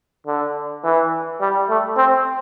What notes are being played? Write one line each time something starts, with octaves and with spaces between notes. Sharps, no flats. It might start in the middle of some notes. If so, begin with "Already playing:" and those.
D3
E3
G3
A3
C4